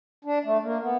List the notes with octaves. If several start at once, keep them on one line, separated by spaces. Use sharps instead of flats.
D4
A3
A#3
B3